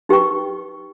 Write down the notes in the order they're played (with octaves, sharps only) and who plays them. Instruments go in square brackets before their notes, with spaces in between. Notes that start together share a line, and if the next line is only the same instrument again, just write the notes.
[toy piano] D#4 G4 B4 G5 C#6